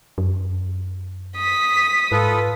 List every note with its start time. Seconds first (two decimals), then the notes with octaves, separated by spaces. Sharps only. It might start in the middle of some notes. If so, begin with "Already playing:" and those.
0.18 F#2
1.37 D#6 B6
2.12 G#2 F4 A4 B4